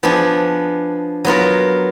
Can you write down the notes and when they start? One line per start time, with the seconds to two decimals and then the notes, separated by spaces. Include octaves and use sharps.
0.03 F3 B3 D4 G#4
1.25 F#3 B3 F4 A#4